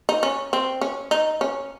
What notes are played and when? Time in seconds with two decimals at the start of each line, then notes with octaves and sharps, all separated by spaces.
0.09 D#4
0.23 C#4
0.53 C4
0.81 C#4
1.11 D#4
1.41 C#4